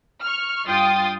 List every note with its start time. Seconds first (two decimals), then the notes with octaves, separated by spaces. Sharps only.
0.22 C#6 F6
0.67 G2 F4 G5 C6 D#6 A6